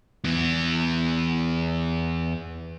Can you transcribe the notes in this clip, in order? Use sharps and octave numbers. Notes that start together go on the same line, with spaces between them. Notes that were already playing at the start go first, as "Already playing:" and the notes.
E2 E3